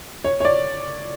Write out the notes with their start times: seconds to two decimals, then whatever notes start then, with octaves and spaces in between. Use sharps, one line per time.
0.24 C#5
0.40 C#5
0.45 D5